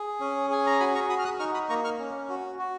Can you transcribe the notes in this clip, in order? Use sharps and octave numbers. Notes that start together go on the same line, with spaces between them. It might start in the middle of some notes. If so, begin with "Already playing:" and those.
Already playing: G#4
C#4
G#4 G#5
A#5
F#4 G#5 B5
A#5 C#6
F#4 B5 D#6
F6
D#6 F#6
D#4 C#6 F6
B5 D#6
A#3 A#5 C#6
C#6 F6
C#4
F#4
F#4